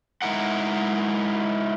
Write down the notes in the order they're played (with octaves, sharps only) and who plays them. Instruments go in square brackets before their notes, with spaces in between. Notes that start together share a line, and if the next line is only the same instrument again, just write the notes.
[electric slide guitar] G#3 D#4 E4 A#4 F#5